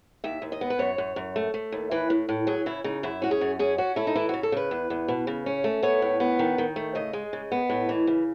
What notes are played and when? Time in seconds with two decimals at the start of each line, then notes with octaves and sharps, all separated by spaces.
0.24 D#2 E5
0.42 D#2
0.52 D#5
0.61 B3
0.70 B4
0.79 F#2 C#5
0.98 F#2
1.16 F#2
1.36 A3
1.54 A3
1.72 D#2
1.91 E3 B4
2.10 A2
2.29 A2
2.47 F#3 G#4
2.66 C#3 E4
2.84 C#3 D#4
3.03 F#2 E4
3.22 C#4 F#4
3.31 G#4
3.41 F#2
3.59 C#4 G#4
3.78 C#4 F#4
3.96 A3 E4
4.07 D#4
4.15 E3 E4
4.29 C#3 F#4
4.43 A4
4.52 C#3 B4
4.71 E2
4.90 E2
5.08 B2
5.27 C#3
5.46 C#4
5.64 A3
5.83 B3 C#5
6.02 A2
6.20 B3
6.39 D#3
6.58 D#3
6.76 A3
6.95 C#3 D#5
7.13 G#3
7.33 C#3
7.52 B3
7.70 A2
7.89 E3
8.07 C#3